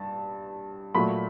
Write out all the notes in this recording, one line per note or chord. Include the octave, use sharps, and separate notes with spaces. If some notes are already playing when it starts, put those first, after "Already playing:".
Already playing: G2 A5
A#2 F#3 A3 B5